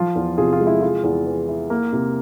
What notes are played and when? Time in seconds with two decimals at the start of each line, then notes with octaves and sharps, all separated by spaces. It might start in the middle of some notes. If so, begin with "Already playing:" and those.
Already playing: F3 F4
0.15 E2
0.38 C3 F4 G#4
0.53 F4
0.61 G#3
0.67 E4
0.81 G#3 F4
1.04 E2
1.26 E3
1.49 E4
1.70 A#3
1.93 C3